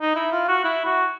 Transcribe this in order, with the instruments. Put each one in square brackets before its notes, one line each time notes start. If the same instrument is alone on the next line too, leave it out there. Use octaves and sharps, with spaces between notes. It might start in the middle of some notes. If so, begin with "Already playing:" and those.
[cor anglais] D#4
E4
F4
F#4
E4
F#4